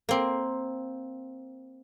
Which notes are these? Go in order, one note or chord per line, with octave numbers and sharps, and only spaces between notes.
A#3 C4